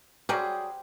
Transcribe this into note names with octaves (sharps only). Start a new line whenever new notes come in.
F#3 G3 G4 G#4 C5 F#5